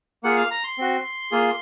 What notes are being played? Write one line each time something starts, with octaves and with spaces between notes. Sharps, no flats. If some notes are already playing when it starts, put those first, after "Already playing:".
A#3 F4 G#4 F#5
F5
A#5
C6
C4 F#4
A#3 F4 G#4